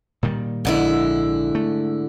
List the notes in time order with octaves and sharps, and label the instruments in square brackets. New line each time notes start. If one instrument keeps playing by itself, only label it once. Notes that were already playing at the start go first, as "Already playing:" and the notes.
[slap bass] A#2 D#3 G3
[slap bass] A#1 [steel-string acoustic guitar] G#2 D3 E4
[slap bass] A3